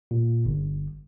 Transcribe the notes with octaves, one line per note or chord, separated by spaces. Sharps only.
A#2
G1